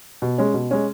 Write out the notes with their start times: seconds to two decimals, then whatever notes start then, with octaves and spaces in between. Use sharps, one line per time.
0.22 B2
0.38 G#3 C#4
0.54 B2
0.71 G#3 C#4